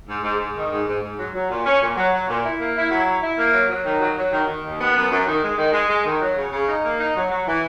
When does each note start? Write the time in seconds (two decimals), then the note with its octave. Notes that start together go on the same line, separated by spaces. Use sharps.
0.08 G#2
0.23 G#2
0.40 G#2
0.56 D#3
0.71 G#2
0.87 G#2
1.02 G#2
1.18 F#3
1.33 F#3
1.49 A#2
1.65 C#4
1.81 A#2
1.96 F#3
2.12 F#3
2.28 A#2
2.43 E4
2.59 A#3
2.74 E4
2.90 F#3
3.06 E4
3.21 E4
3.38 A#3
3.53 F#3
3.68 F#3
3.85 D#3
4.00 F#3
4.17 F#3
4.32 D#3
4.47 D#3
4.63 D#2
4.79 B3
4.94 F#2
5.10 F#2
5.26 D#3
5.42 G#3
5.57 D#3
5.72 G#3
5.88 G#3
6.04 D#3
6.21 F#3
6.36 C#3
6.51 C#3
6.67 D#4
6.83 A#3
6.98 D#4
7.15 F#3
7.29 F#3
7.46 E3